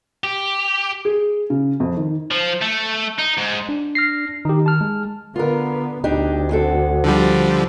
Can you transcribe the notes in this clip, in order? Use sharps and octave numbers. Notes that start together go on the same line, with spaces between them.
G4
G#4
C#3
F2
D#3
F3
A3
D#4
G#2
D4
F6 A#6 C7
D#3 D#4 G4
A5 F6
G#3
D3 B3 F4 A#4
D2 D4 D#4 G4
C4 F#4 A4
D3 F3 G3